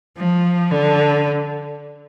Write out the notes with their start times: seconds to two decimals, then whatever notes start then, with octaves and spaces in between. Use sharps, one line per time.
0.17 F3
0.71 D3